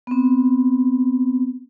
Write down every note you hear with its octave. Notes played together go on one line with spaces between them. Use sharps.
B3 C4